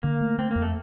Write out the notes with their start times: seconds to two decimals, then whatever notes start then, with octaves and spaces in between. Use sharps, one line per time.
0.03 D3 A#3
0.21 A3
0.38 A3 C4
0.51 F2 A#3
0.62 A3